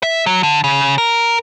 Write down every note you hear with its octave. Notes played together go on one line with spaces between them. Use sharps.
E5
F#3
D3
C#3
A#4